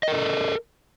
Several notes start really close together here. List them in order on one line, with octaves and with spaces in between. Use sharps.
D#5 A#4 A4